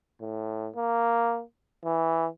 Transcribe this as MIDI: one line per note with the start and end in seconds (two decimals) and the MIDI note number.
0.21 0.70 45
0.76 1.42 58
1.84 2.27 52